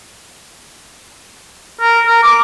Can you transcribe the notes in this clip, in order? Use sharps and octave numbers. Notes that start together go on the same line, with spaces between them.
A#4
A#4
D6